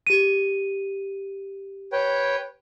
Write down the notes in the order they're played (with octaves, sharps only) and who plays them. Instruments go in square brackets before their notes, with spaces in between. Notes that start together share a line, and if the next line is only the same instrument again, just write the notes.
[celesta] G4 D#7
[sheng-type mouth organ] B4 C#5 G5